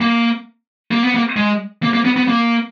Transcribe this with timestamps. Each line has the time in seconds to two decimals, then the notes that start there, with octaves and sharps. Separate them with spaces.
0.01 A#3
0.91 A#3
1.03 B3
1.14 A#3
1.36 G#3
1.83 A#3
1.93 A#3
2.05 B3
2.16 B3
2.28 A#3